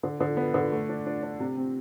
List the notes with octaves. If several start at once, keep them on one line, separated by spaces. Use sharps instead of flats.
D3
D3
B3
D3
A3
D4
D4
D4
C3
C4